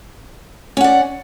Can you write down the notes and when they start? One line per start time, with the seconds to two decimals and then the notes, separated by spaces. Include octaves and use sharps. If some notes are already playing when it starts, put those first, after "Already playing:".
0.77 C#4
0.81 F#5
0.84 D5